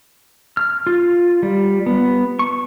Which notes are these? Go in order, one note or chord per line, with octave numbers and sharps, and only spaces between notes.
F6
F4
G3
B3
C#6